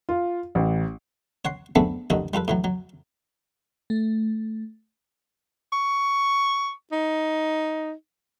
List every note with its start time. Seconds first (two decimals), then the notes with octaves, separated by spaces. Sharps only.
0.09 F4
0.55 A1
1.45 C#5 F#5 C6
1.76 A3 B3 C4 D4 G#4 A4
2.10 A1 D#2 D3 F#4 D#5
2.34 G3 F4 A4 B4
2.48 A2 E3 F#3
2.64 F#3
3.90 A3
5.73 C#6
6.92 D#4